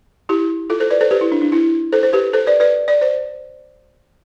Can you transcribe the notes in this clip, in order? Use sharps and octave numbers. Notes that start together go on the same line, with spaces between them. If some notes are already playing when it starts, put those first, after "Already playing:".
E4 G4
F4 A4
A4 C5
B4 D5
A4 C5
G4 B4
E4
D4
D4
E4
A4 C5
A4 C5
G4 B4
A4 C5
B4 D5
B4 D5
D5
C5